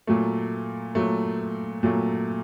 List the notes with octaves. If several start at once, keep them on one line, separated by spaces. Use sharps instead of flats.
A#2 F#3 A3
A#2 F#3 A3
A#2 F#3 A3